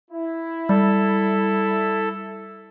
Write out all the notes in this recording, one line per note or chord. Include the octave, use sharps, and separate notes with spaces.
E4
G3 A4